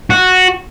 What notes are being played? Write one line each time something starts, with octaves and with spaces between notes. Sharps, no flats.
F#4